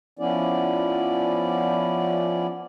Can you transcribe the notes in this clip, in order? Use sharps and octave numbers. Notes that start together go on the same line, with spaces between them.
F3 B3 C#4 E4 D5